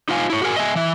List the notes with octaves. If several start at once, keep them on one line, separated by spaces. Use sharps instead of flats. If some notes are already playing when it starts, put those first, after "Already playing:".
D#4 F4 C5 F5 G5 G#5
E4 C#5
F#4 G#4 A#4 G#5
D#5 E5 G#5
E3 E5